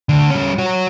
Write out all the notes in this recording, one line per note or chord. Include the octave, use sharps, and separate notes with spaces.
D2 D3
G3 C#4
F#4 C#5